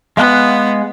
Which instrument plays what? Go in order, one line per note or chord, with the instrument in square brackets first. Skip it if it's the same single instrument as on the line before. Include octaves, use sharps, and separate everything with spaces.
[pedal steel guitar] G#3 F5 F#6 [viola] B3